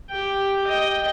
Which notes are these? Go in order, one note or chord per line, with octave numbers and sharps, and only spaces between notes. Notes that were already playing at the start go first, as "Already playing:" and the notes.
G4 G5
D#5 G5